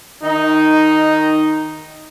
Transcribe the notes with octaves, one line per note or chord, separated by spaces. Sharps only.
D#3 D#4